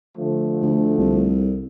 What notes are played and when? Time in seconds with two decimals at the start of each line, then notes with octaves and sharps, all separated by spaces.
0.18 D3 F3 A3
0.62 D2
0.98 C2